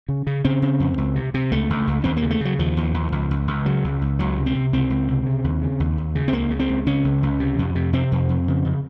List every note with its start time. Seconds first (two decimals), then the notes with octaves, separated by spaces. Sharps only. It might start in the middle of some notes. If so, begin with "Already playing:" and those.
0.09 C#3
0.27 C#3
0.45 C#3 C4
0.62 C#3
0.80 F2
0.98 C#2
1.16 C3
1.34 C3
1.52 C#2 A3
1.70 C#2
1.87 C#2
2.04 D#2 C4
2.17 A#3
2.22 C#3
2.30 A3
2.41 C#3 F#3
2.59 D#2 F3
2.77 D#2
2.94 D#2
3.12 C#2
3.31 C#2
3.47 C#2
3.65 C#3 F#3
3.84 C#2
4.01 C#2
4.19 C#2 F#3
4.38 C3
4.46 C4
4.55 C3
4.73 C#2 C4
4.90 C#2
5.08 C3
5.26 C#3
5.44 D#2
5.62 C#3
5.80 D#2
5.98 D#2
6.15 C#3
6.28 C4
6.33 C#2 A#3
6.50 C#3
6.60 C4
6.69 C#2
6.86 C#3 C#4
7.04 C#2
7.23 C#2
7.40 C3
7.59 F2
7.75 C3
7.93 C3 C4
8.12 F2
8.29 F2
8.48 C#3
8.65 C#3